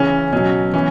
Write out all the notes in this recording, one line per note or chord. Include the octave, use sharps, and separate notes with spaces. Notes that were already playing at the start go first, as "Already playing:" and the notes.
Already playing: C#3 E3 C#4
B2 F#3 C#4
E3 C#4